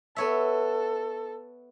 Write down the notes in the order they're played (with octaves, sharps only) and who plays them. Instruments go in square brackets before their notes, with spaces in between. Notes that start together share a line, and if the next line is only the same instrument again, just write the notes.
[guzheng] B3 C#5 E5 [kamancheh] A4